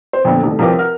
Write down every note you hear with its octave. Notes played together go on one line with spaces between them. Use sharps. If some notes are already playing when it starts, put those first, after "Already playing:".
C5
F2 A#2 D3 B3
C2 D#3 A3
C2 F3 C4 A#4 B4 D6
A#4 F#5 F6